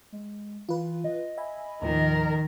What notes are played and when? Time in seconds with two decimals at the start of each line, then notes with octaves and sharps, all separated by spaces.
0.12 G#3
0.69 E3 F4 B4
1.04 D#5
1.38 E5 G#5 B5
1.82 D#2 A2 D#3 F3 A#4